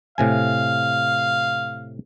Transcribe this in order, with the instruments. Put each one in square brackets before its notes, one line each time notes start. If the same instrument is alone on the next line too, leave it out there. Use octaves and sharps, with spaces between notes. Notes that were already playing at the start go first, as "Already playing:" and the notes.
[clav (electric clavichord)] A2 C3 G#5 [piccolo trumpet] F5